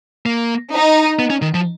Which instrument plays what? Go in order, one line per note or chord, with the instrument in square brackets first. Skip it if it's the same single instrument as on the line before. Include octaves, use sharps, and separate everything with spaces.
[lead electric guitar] A#3
[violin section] D#4
[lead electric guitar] B3
C#4
D#3
F3